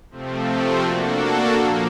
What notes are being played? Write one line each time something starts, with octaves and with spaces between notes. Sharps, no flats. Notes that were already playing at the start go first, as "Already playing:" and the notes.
C3 F3 A3 C4
A#3 D4 F#4 A4
A#2 F3 A#3